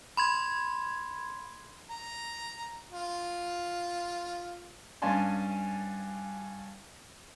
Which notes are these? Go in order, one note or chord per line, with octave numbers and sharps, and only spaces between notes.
B5 C6 G#6
A#5
F4
G2 C#4 F5 G#5 A5 C6